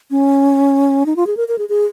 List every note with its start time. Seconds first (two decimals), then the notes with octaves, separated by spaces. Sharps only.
0.11 C#4
1.06 D#4
1.16 F4
1.27 G#4
1.37 A#4
1.48 A#4
1.58 G#4
1.69 G#4